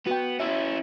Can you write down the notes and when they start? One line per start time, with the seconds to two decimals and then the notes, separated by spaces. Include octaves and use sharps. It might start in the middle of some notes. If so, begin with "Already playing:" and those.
0.07 B3 F#4 G5
0.40 C#4 E4 E5